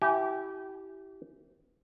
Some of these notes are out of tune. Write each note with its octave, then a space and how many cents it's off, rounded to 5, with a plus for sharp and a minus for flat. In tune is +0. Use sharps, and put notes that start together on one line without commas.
E4 +0 G4 -25 G#5 -5